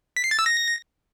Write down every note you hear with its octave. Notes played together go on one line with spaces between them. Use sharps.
B6
C7
A6
E6
A#6